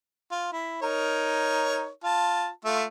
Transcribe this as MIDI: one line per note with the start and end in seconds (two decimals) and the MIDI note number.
0.31 0.49 65
0.53 0.80 64
0.82 1.88 63
0.82 1.88 70
0.82 1.88 73
2.04 2.49 65
2.04 2.49 81
2.65 2.84 57
2.65 2.84 65
2.65 2.84 76